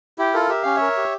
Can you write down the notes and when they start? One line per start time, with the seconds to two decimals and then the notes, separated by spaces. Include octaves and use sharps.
0.18 E4 G4
0.34 F4 A4 A#4
0.49 G4 E5
0.63 C#4 F5
0.75 C#5 E5
0.81 A#4
0.97 G4